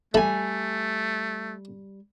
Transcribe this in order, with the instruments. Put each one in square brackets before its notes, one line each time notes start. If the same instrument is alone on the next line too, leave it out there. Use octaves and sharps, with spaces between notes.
[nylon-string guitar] G3 G#5 [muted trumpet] A3 [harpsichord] A4 E5 B5